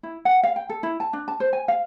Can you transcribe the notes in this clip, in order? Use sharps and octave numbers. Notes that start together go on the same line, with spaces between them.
E4
F#5
F5
G5
A4
E4
A5
D4
A5
C5
G#5
F5